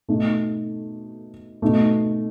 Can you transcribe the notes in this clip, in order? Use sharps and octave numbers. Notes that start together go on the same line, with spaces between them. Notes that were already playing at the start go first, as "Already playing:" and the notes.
B2 A3 D#4
B2 A3 D#4